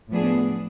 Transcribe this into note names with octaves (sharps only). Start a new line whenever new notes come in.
A2 F3 B3 D4 G#4